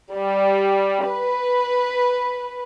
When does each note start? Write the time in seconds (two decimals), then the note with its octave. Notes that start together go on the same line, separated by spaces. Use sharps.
0.14 G3
1.10 B4